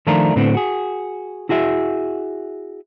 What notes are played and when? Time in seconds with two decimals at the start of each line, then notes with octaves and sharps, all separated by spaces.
0.07 D#3 F3 A3 D4 F4 A#4
0.36 A2 D3 B3 C4
0.54 F#4 G#4
1.49 E4 F#4 G#4 E5